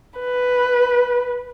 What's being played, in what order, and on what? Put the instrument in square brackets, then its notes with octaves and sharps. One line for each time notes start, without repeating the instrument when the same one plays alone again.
[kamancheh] B4